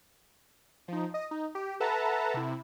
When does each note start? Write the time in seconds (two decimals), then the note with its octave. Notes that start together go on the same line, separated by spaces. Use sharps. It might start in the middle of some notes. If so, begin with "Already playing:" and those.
0.88 F3 D#4
1.14 D#5
1.31 D#4
1.55 G4
1.80 A4 B4 E5 F#5 A5 A#5
2.34 C3 E4